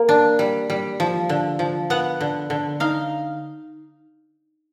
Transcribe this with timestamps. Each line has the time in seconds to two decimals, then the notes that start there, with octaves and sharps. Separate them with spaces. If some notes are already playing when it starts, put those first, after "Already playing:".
Already playing: A#3
0.09 D4
0.39 G3
0.70 G3
1.00 F3
1.29 D3
1.59 F3
1.90 B3 F#5
2.21 D3
2.50 D3
2.80 D#4 F5